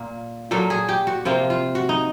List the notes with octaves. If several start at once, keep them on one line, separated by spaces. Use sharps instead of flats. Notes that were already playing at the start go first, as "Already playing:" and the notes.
Already playing: A#2 A#3
A#2 F#3 A#3 A4
G#4
G4
F#4
C3 F3 A#3 F4
F4
F#4
D#4